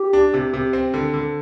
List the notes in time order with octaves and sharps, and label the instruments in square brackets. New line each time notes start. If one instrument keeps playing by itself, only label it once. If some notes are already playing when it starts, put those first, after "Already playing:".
Already playing: [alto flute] G4
[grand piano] D4
C3
C3
C4
D3
D3